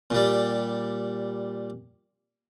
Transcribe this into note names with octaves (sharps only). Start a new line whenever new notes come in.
A#2 G3